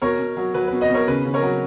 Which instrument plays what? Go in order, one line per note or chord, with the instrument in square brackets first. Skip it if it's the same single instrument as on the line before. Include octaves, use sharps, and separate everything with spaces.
[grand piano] B2 A#4 C#5
B2
F#3
F#3 B4
B4
B2
B4 D#5
B2 A#4 C#5
C#3 B4
C#3
A#4 C#5
F#3